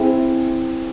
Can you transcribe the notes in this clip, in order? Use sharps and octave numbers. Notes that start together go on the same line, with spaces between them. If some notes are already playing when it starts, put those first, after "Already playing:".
Already playing: C4 E4 G#4